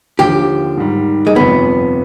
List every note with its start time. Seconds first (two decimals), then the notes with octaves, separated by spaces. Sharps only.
0.19 D#2 D3 F3 G4
0.77 G#2 D#3 G3
1.27 G#3
1.36 G1 F2 C3 F3 B3